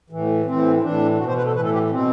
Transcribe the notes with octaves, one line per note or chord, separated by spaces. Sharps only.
A2 E3
A2 E3 C4
E4
A2 E3 D4
B2 F#4
C5
B4
A4
A2 E3 B4
A4
G4
B2 C4